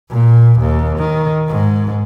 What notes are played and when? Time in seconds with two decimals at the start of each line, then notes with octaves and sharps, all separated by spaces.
0.10 A#2
0.60 D#2
0.99 D#3
1.48 G#2